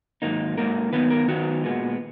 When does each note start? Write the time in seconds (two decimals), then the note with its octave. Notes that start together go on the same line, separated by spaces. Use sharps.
0.22 G#2 D#3 F#3 A#3 D#4
0.58 G#2 D#3 F#3 A#3 D#4 A#4
0.92 D#3 F#3 B3 D#4 B4
1.10 A#4
1.28 D#3 F#3 B3 D#4 F#4
1.63 A#2 G#3 B3